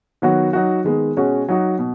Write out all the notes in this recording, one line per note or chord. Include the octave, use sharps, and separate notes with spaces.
D#3 F#3 B3 F#4
F#3 D#4 F#4
D#3 G#3 B3
B2 G#3 C#4 F#4
F#3 D#4 F#4
B2